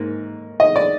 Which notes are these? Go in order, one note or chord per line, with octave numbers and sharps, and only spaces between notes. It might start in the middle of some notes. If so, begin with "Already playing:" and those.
Already playing: G#2 A#3
D#5
D5